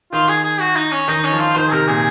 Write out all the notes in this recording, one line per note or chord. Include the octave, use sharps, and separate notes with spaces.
D#3 F4
G#4
G#4
F#4
D#4
C#4
D#3 D#4
C#4
F3
F4
D#3 C5
G#4
C3 A#4
A#2 G#4